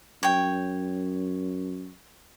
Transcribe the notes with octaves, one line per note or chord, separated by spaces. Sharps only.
F#2 C#5 G5